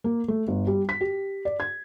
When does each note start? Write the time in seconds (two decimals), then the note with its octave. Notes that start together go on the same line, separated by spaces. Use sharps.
0.04 A#3
0.28 A3
0.48 G1
0.67 G3
0.89 B6
1.01 G4
1.45 D5
1.60 G#6